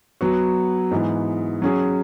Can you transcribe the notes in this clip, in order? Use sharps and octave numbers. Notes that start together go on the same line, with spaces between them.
F#3 B3 F#4
G#2 E3 B3
F#3 C#4 G#4